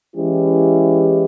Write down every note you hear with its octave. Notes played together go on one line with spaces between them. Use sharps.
E3 G#3 C#4 E4 G4